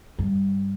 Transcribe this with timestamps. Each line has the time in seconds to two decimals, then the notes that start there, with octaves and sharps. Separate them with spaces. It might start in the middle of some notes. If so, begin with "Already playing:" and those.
0.18 G2